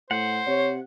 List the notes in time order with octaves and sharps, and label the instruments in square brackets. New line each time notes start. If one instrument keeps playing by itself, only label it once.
[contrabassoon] A2 [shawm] C5 [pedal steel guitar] F#5
[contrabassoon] C3 [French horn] C#5